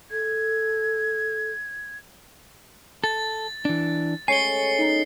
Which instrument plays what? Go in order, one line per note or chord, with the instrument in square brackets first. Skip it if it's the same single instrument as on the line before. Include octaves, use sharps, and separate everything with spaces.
[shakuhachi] A4 [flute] G#6
[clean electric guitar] A4 [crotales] A6
[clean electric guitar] E3 D4
[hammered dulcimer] G#3 A3 C#4 [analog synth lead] C#5 [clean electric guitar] G#5 [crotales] C7 C#7 G7
[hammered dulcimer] B3 [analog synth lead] D#4